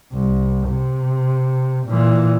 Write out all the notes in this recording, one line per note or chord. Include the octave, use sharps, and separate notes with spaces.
C2
C3
A#2 E3